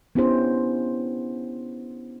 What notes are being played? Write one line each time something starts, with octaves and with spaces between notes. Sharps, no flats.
B3 C#4 D4 E4 G4 C5